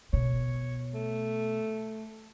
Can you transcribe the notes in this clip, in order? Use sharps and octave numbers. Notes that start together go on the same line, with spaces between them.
B2 C#5
A3